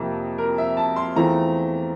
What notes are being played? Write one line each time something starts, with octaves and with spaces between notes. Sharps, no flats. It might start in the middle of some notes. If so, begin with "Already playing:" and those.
Already playing: F2 C3 F3 A#3
A#4
E5
A5
C6
E2 E3 A3 C4 F4 A#5